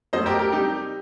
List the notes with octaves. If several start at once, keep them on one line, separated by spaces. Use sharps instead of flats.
F#2 F#3 A3 C5 D#5
G4 A#4
G4 A#4
C3 G3 D#4 G4